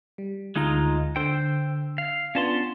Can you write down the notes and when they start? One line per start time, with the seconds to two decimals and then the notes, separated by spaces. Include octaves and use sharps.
0.18 G3
0.56 D2 G#3 D#4 F4 A#5
1.16 D3 C5 G5 E6
1.98 F5
2.35 B3 C#4 D4 F4 A5 C6